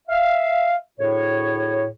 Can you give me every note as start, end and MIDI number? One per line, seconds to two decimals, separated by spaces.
0.08 0.74 76
0.08 0.74 77
0.99 1.85 38
0.99 1.85 45
0.99 1.85 68
0.99 1.85 73